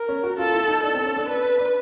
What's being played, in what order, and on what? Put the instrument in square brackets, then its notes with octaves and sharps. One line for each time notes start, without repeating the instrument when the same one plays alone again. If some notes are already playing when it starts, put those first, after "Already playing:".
Already playing: [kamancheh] A#4
[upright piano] C#4
F#4
[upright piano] F4 [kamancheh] A4
[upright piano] F4
E4
D#4
[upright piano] D4 [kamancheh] A4
[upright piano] C4
C#4
D4
[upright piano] D4 [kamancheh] B4
[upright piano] D4
D4